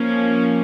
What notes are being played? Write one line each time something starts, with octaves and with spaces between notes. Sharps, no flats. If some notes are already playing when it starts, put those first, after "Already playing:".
Already playing: F3 A#3 C#4